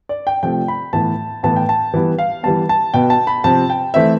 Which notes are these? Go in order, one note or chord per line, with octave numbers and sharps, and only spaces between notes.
D5
G5
C3 F3 A3 G5
B5
A2 E3 B3 A5
A2 E3 B3 A5
G5
A5
E3 G3 B3
F5
E3 G3 B3 A5
A5
B2 B3 G5
A5
B5
C3 F3 C4 A5
G5
E3 A3 C4 E5